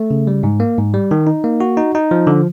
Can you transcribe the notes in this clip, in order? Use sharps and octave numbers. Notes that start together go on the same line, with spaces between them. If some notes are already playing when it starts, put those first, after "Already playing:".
Already playing: A3
C#3
G3
G#2
A#3
G#2
G3
D#3
D#4
A#3
F#4
D#4
D#4
F3
D3